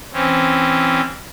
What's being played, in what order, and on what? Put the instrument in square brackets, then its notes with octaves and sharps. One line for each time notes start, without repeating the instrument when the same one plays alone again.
[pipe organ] E3 C4 C#4